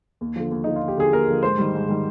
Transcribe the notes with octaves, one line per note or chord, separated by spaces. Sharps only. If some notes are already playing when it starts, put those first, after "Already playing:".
D#2
D3 F3
D#2
D3 F3 D#4
F4
D#2
G4
D3 F3 G#4
D#2 A#4
D3 F3
G#2 C5
D#3 G3
G#2
D#3 G3